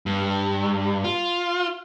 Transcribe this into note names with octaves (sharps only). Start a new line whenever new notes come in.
G2
F4